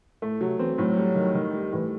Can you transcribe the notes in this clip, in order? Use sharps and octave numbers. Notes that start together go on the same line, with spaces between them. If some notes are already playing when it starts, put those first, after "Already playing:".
A2 A3
C3 F#3
E3 C4
A2 F#3
G3
D#3
D#3
G3
A2 E3